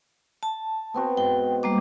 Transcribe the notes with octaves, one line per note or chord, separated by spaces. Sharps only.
A5
B3 C4 F#4
G#2 G5
G3 A#3 D6